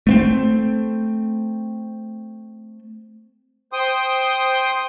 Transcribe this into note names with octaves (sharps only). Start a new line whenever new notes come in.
A3 B3 C4
C5 G5 C6 D#6